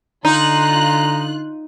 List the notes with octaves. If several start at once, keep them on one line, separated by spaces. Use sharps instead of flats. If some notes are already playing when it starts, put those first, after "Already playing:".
D3 D#4 F4 A#5 F#6